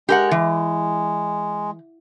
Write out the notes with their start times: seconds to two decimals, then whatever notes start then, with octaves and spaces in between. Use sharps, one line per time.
0.09 G#3 G4 A#4 F#5
0.31 E3